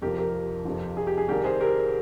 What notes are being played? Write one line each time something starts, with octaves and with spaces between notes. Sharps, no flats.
F2 C3 F3 G4 A#4
G4 A#4
F2 C3 F3
G#4
G4
G#4
C2 C3 D#3 G4 A#4
G#4 C5
G4 A#4